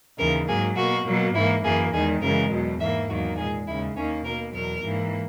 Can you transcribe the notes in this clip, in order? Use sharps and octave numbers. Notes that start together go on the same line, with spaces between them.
D#2 C#3 E3 A#4
G#2 F#3 A#3 G#4
B2 A#3 F#4
B2 F#3 A#3
G#2 E3 A#3 E4
F#2 E3 A#3 G#4
E2 D#3 G#3 G#4
F#2 C#3 E3 G#3 A#4
E2 B2 F#3
G#2 E3 A#3 E5
E2 D#3 F#3 A#3 F#4
A#2 G#3 G#4
D#2 C#3 G#3 E4
D#2 D#3 A#3 C#4
B2 A#3 A#4
E2 B2 F#3 A#4
G#2 E3 A#3